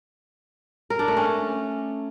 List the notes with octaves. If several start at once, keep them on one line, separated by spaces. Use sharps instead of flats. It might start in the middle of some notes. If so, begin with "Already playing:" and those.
A#4
D4
A3
C#4